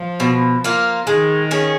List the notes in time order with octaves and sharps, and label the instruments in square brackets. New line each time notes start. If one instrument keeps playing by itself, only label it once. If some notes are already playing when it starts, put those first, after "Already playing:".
Already playing: [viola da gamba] F3
[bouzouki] B2
A#3 F4
[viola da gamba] D#3 [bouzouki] G#3
[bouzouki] C#4 G#4